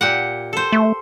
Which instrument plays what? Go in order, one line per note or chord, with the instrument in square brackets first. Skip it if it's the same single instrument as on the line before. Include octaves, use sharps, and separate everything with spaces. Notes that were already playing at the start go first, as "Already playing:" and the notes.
[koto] A#2 G4 F#5
A4 C5
[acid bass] A3